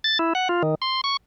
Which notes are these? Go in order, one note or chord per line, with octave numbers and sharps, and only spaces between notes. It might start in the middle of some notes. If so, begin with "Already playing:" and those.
A6
E4
F#5
F4
D#3
C6
C#6